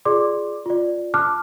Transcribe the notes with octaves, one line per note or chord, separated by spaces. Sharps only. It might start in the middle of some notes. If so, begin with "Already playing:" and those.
F4 G#4 D5 C6 D6
F4 D5
A5 D6 F6 F#6